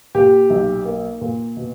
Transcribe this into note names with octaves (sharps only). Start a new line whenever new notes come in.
A#2 G4
B1
A#3
A#2
B2